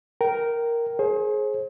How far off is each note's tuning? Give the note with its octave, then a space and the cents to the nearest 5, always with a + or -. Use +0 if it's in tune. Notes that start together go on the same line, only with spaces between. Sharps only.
A#4 +0 G5 -20
G#4 +25 C5 +40